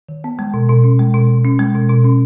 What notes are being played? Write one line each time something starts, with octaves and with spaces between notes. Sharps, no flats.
D#3
B3
G#3
B2
B2
C#4
G#3
B2
B2
C#4
G#3
B2
B2
C#4